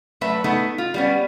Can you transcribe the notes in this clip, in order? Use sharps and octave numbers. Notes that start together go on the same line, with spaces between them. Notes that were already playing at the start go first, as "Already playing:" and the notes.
F#3 A3 B4 E5
A3 B3 D#4
F4
G3 B3 C#4